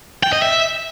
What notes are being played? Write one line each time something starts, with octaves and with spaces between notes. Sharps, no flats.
G5
D#5
E5